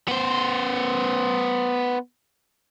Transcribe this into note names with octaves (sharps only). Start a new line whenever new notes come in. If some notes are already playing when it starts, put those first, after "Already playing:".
B3 C5